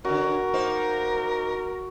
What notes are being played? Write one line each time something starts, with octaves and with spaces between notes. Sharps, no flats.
D3 C#4 F#4 A#4
A#3 D#4 C5